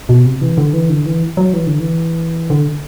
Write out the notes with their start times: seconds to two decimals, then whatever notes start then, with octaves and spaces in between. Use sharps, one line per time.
0.09 B2
0.25 C3
0.41 E3
0.57 D3
0.73 E3
0.89 D3
1.06 E3
1.37 F#3
1.53 E3
1.67 D3
1.80 E3
2.50 D3